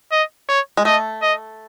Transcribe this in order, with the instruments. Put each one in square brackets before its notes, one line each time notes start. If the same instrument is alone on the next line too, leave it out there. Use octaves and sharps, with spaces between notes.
[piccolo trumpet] D#5
C#5
[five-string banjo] G#3
[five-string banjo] A3 [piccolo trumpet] D#5
[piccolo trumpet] D#5